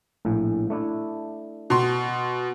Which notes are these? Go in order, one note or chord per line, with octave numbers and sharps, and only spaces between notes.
A#1 A2
A3 D4 E4
B2 C6